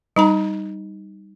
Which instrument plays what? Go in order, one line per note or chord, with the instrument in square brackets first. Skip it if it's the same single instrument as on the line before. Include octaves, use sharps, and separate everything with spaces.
[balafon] G3 D#4 A#5